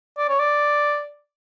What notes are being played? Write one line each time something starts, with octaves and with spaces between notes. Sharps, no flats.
D5
C#5
D5